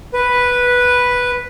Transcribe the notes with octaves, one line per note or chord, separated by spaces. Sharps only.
B4